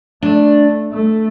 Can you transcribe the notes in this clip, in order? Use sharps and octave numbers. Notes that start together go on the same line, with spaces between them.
A3 D4
A3